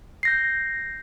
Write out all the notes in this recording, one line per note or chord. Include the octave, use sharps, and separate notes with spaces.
G6 A#6 C7